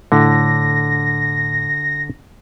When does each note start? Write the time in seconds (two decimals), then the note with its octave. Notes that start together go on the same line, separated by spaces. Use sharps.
0.12 A2 D3 A#6